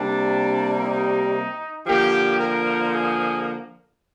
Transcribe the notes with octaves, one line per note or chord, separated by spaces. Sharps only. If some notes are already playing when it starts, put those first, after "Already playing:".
Already playing: C3 G3 A#3 D4
D#4
D3 F3 A#3 G4
A#4
G#4